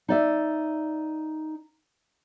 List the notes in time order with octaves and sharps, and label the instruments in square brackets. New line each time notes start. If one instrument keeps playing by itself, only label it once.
[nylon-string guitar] D#4 D5 E5